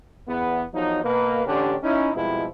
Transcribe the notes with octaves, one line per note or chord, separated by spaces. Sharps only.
E2 B3
E2 F3 F#3 D#4
B2 A#3 B4
A1 D3 C#4 D4 G4
C#4 D#4 E4
F2 B2 F3 G3 G#3 E4